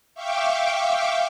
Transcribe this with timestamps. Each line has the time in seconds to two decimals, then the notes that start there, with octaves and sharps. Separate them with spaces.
0.15 E5 F5 G5 C#6 D6